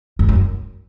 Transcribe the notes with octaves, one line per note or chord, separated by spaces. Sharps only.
F2
F#2